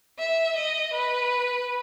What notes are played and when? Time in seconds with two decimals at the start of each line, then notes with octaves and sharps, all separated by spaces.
0.19 E5
0.56 D#5
0.93 B4